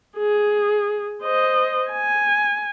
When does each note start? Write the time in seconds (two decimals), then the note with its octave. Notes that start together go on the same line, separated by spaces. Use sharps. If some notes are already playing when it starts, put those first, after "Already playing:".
0.17 G#4
1.23 C5 D#5
1.92 G#5